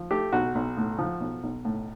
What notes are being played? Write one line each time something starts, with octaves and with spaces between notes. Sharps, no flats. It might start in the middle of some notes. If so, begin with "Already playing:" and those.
Already playing: F3
A3 G4
B1 F#4
B1
A2
F3
B1
B1
A2